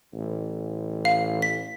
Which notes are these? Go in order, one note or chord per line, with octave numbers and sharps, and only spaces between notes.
A1
F5
B6